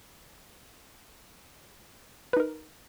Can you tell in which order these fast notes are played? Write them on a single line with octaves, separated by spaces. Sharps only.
B4 D#4 A#4